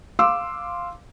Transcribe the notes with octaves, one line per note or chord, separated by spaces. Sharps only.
F5 C6 D6 E6